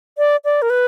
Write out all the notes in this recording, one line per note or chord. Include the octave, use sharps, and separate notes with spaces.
D5
D5
A#4
B4